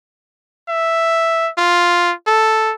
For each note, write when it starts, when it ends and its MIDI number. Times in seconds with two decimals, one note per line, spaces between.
0.68 1.49 76
1.58 2.13 65
2.27 2.74 69